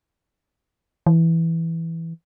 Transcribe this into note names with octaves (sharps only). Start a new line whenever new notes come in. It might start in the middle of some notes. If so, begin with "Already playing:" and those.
E3